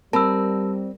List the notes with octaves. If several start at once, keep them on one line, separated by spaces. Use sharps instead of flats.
G3 C4 A#4 A5 B5 E6